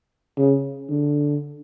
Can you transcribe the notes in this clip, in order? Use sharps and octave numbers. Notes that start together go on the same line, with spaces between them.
C#3
D3